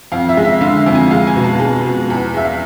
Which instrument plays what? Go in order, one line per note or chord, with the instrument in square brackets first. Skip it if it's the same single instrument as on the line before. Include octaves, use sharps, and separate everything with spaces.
[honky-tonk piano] F2 F5
E5
G#3
E5
D3 F5
F2
G#5
G#3 F5
G#5
B2
A5
G#3
B2
E2
G#3 E5
F5